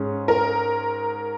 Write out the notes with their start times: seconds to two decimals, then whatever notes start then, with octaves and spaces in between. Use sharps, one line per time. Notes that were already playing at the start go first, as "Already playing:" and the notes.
Already playing: G#2 C#4 G#4
0.28 A#4